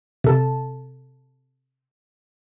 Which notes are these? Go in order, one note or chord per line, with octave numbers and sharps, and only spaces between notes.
C3 A4 A5